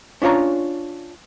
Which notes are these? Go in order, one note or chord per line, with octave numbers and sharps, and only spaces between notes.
C#4 D4 F4 C#5 A#5